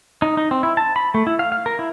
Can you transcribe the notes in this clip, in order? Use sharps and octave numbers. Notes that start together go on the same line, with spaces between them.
D#4
D#4
C4
E4
A5
B5
A3
E4
F5
F5
A#4
E4